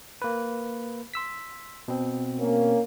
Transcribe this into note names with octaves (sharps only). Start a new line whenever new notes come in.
A#3 B4
C6 E6 B6
B2 C4
A#3 C#4